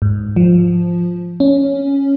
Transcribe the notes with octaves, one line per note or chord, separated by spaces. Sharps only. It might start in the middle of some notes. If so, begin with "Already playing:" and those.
G#2
F3
C#4